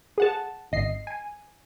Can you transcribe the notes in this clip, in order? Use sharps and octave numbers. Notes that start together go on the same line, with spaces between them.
G#4 F#5 A5
G#1 D#5 C7
G#5